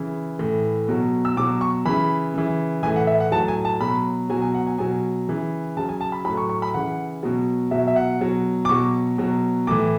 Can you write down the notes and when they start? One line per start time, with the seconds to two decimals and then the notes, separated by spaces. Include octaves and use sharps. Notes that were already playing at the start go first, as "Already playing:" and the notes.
Already playing: C#3 E3
0.39 A2 E3
0.88 B2 F#3
1.25 E6
1.37 B2 F#3 D6
1.61 C#6
1.85 C#3 E3 B5
2.34 C#3 E3
2.83 A2 E3 G#5
2.96 F#5
3.07 E5
3.20 F#5
3.32 A2 F#3 A5
3.48 G#5
3.65 A5
3.81 B2 F#3 B5
4.30 B2 F#3 G#5
4.42 G#5
4.54 F#5
4.67 G#5
4.78 B2 F#3 G#5
5.28 C#3 E3
5.77 C#3 F#3 A5
5.89 G#5
6.01 A5
6.12 B5
6.25 A2 F#3 B5
6.37 C#6
6.49 C#6
6.62 B5
6.74 C#3 E3 F#5
7.23 B2 F#3
7.71 B2 F#3 E5
7.87 E5
7.96 F#5
8.21 B2 F#3
8.65 D6
8.69 B2 F#3 C#6
9.18 B2 F#3
9.67 A2 E3 D6